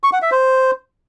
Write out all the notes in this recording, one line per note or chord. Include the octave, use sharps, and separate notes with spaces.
C#6
F#5
E5
C5